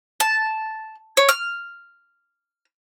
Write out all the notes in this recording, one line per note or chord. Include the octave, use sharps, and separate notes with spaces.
A5
C#5
F6